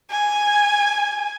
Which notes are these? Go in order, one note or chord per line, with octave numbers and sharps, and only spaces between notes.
G#5